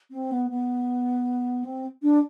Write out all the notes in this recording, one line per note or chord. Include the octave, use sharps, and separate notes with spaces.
C4
B3
B3
C4
D4